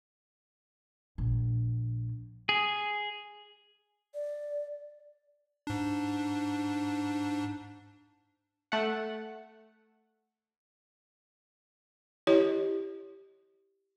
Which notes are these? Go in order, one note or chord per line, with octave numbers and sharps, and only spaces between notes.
A#1
G#4
D5
G#2 D4
A3 F#5
E4 G4 C#5 D#5